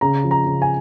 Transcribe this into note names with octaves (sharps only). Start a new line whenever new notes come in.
C#3 A#5
F3
A#5
C#3
G#5